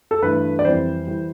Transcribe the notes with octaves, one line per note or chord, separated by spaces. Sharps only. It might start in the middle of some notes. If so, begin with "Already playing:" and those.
A4
G2 E3 A3 B4
D5
F2 E3 G3 C5
E3 G3